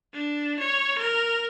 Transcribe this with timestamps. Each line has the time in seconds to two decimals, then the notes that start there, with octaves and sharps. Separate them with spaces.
0.13 D4
0.59 C#5
0.98 A#4